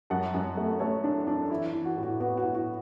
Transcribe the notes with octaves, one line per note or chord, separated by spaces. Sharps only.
F#2 F#5 A5
F#2
A3
A3 A4 C#5
D4
D4
E3 E4
E3
F#4
A2
F#4
B3 F#4
F#4
A2
F#4